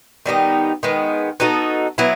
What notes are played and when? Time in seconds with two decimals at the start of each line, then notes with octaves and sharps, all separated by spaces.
0.26 D#3 G3 B3 D#4
0.83 D#3 G#3 B3
1.40 B3 D#4 F#4 A4
1.98 F#3 B3 E4